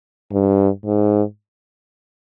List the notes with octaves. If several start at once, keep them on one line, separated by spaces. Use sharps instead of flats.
G2
G#2